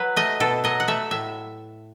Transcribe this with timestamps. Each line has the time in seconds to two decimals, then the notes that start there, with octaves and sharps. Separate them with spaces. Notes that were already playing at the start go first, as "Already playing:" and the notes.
Already playing: F#3 B4
0.16 A3 D#5
0.40 B2 A4
0.64 F#3 D#5
0.80 F#5
0.88 A3 E5
1.11 A2 E5